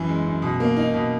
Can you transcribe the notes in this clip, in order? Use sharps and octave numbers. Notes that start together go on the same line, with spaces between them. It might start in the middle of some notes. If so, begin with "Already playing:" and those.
Already playing: F#2 E3
G#3
F#2
B2
A#3
D#4
B2